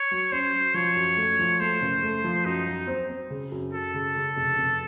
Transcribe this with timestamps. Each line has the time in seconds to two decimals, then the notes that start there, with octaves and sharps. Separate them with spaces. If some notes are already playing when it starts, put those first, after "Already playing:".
Already playing: C#5
0.11 F#3
0.32 C#4 C5
0.53 F#3
0.74 F3 C#5
0.96 F#2
1.17 A3
1.39 F3
1.60 A3 C5
1.82 F#1
2.03 A3
2.24 F3
2.45 F#2 D#4
2.66 F#3
2.87 C4
3.09 C4
3.30 C#3
3.52 F#2
3.73 F#2 A4
3.94 C#3
4.16 C#3
4.37 F1
4.58 F1